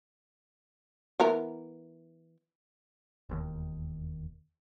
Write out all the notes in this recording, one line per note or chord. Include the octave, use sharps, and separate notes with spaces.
E3 B3 A#4
E1 D#2 D#3